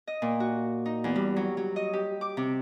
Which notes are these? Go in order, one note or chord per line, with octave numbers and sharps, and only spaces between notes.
D#5
A#2
F#4
D#4
E2
G3
F#3
F#3
D#5
G4
D6
C3